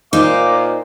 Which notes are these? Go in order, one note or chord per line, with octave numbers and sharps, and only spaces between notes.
A#2 D#4 C5 F5 D6